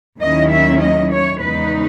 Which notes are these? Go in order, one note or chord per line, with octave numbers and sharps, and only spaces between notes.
D#2 D#3 F#3 C#4 E4 D#5
E5
D#5
C#5
E2 C#3 G#3 D#4 B4